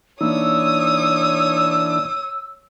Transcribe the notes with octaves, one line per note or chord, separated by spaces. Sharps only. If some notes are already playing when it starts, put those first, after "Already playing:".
E3 A#3 D4 D#4 C#5 D#6 E6